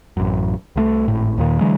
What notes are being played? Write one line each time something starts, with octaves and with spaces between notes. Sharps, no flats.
A1 F#2
C2 E3 A3
G#1 A2
D#2 A#2 D#3
D3 E3 F#3 G#3